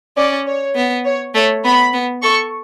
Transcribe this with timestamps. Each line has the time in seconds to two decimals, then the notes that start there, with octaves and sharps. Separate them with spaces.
0.17 C#4 D5
0.47 C#5
0.76 B3
1.05 C#5
1.34 A3 C#5
1.65 B3 B5
1.93 B3
2.23 A4 C#6